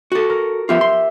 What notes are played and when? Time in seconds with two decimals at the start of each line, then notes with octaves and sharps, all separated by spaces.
0.12 F#4 A4
0.30 A#4
0.69 F3 B3 F4 G4 E5
0.81 C6